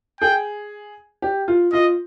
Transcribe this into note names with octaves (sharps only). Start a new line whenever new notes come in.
G#4 G5
G4
F4
F4 D#5